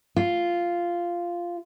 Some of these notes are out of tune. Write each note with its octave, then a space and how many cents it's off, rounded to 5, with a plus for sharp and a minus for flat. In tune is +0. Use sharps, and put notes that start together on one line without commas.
F4 -5